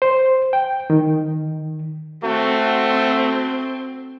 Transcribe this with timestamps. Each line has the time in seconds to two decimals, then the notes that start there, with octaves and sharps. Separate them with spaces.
0.02 C5
0.53 G5
0.90 D#3
2.24 A3 C4 F#4